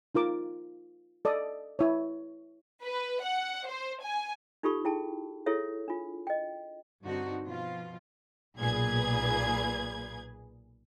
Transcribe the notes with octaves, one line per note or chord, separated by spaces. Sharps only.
D#4 F4 A#4 D6
A4 D5 D#5 D#6
E4 C#5
B4
F#5
C5
G#5
D#4 F4 G4 A4 B5 C#6
E4 G#4 G5 A5
E4 G#4 A4 C#5 E5
D4 F4
D#5 G5
G2 D3 C4 D#4 F#4
B2 F3 F4
B1 A#2 G#4 B4 G#6